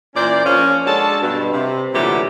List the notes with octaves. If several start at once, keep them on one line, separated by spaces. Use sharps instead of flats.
A#2 E3 C#4 C5 D5
F3 A#3 C#4
G#3 D4 F#4 A4 A5
G2 B2
C3
A#2 D3 E3 F#3 A3 G4